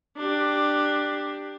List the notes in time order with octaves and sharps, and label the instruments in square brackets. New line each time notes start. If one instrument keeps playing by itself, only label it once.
[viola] D4 G4